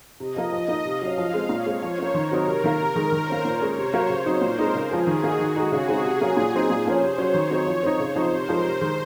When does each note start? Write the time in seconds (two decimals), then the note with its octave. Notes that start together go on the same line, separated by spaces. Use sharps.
0.20 C3 D#5
0.36 F3 A#3
0.52 F3
0.68 A#3 D#4
0.85 C3 F5
1.01 F#3 C#4
1.18 F3 F5
1.34 G#3 C4
1.49 A#2 C#5
1.66 G#3 C4
1.82 F3 C5
1.98 A#3 C#4
2.14 D#3 A#4
2.31 F#3 C4 D#4
2.47 C3
2.64 D#3 A#3
2.80 C3
2.96 D#3 G#3
3.12 D#3 C5
3.28 A#3 C#4
3.45 A#2 C#5
3.61 G#3 C#4
3.77 C3 C5
3.93 F#3 A#3
4.09 C#3 C5
4.26 F#3 C4 D#4
4.42 A#2 A#4
4.59 G#3 C4 D#4
4.75 C#3 G#4
4.91 F3 G#3
5.07 D#3 F#4
5.24 A#3 D#4
5.39 D#3 F#4
5.56 G#3 D#4
5.72 C#3 G#4
5.88 G#3 C4 D#4
6.05 C3
6.21 F#3 A#3 C#4
6.37 A#2
6.53 F#3 C4 D#4
6.70 A#2 C5
6.86 F3 A#3 C#4
7.02 C3 C#5
7.18 F#3 C#4
7.34 D#3
7.50 F#3 C4 D#4
7.67 F3 C#5
7.83 C4 D#4
7.99 C#3 C5
8.16 F3 C4 D#4
8.32 C3 A#4
8.49 F3 G#3 D#4
8.64 C3 C5
8.81 D#3 G#3